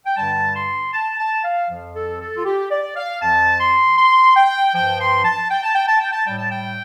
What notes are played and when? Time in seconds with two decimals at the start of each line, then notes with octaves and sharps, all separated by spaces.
0.06 G5
0.17 G2 D3 G3 A5
0.56 C6
0.93 A5
1.19 A5
1.44 F5
1.70 F2 F3
1.95 A4
2.20 A4
2.36 F4
2.45 G4
2.71 D5
2.97 F5
3.22 F2 F3 A5
3.60 C6
3.98 C6
4.37 G5
4.74 G2 F3 G5
4.99 C6
5.25 A5
5.50 G5
5.63 A5
5.75 G5
5.88 A5
6.01 G5
6.13 A5
6.26 A2 G3 G5
6.38 A5
6.51 G5